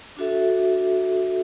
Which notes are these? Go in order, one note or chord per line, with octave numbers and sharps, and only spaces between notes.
D4 F#4 A4 E5